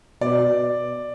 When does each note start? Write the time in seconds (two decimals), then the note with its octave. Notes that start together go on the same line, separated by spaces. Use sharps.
0.21 B2 D5